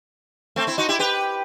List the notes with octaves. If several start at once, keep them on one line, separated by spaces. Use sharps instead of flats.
A3 C4
C4 E4
D#4 F#4
E4 G4
G4 B4